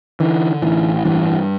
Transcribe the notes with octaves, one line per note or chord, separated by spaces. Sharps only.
D3 E3
A1 E3
G2 E3